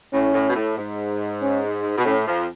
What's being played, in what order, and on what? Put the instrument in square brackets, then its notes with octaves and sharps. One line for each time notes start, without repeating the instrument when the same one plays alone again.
[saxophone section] A2 [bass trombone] C#4
[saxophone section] A2
B2
A2
G#2
[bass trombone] C#4
[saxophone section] B2
[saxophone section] A2 [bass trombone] C#4
[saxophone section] F2 F3